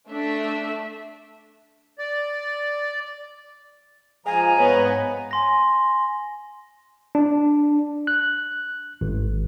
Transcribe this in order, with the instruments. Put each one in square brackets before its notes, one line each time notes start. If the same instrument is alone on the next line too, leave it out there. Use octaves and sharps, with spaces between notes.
[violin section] A3 D4 E5
[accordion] D5
[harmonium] F3 [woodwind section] G#3 F5 A#5 [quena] G#5
[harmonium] G#2 C#5 [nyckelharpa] B3 B4
[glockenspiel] G#5 C6 A#6
[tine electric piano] D4
F#6
G#1